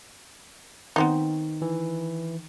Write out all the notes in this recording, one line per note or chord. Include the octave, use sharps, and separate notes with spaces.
D#3 B3 C4 D#4
E3